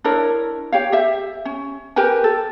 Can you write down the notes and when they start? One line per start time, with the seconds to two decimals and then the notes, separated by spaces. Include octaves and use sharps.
0.04 D4 E4 A#4 C#5
0.72 G4 C#5 F5
0.92 G4 E5
1.45 C#4
1.96 G4 A#4 B4 G#5
2.24 A4